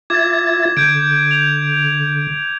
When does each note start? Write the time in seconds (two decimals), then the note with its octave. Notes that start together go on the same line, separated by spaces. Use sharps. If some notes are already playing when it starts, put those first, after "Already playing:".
0.10 F4 E5 D6 G#6 A6
0.77 D3 G6 G#6 D7
1.31 F7